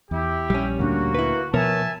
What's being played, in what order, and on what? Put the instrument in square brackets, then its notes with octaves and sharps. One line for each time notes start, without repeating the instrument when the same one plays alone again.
[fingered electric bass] E2 [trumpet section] E4 G4
[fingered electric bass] A#1 [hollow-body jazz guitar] G3 C#4
[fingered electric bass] D2 A#2 D4 [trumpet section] A#3 F#4
[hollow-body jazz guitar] E4 B4
[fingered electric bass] B2 F3 [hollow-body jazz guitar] B3 A#4 C#5 [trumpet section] E5 G#5 A5